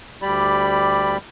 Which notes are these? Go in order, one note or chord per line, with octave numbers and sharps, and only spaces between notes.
D2 G3 G4 D5 B5